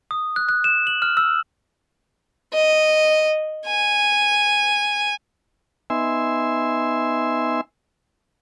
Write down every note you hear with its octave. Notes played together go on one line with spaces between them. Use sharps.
D#6
F#6
F#6
E7
F#7
F6
E6
D#5
G#5
B3 D#4 E5 G#5 C6 E6